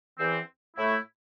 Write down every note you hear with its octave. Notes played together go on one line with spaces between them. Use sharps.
E2 E3 C4
A2 A3 E4